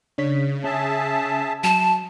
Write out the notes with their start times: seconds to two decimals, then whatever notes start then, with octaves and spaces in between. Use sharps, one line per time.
0.18 C#3 D4 C#5 B6
0.64 C#4 G#4 E5 A5
1.64 F#3 A5